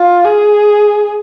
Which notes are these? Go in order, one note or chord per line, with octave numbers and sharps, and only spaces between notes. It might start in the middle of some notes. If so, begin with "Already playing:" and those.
Already playing: F4
G#4